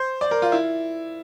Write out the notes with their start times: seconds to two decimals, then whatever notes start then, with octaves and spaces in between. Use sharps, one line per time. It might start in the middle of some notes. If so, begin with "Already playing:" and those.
Already playing: C5
0.21 D5
0.31 A#4
0.42 F4
0.52 E4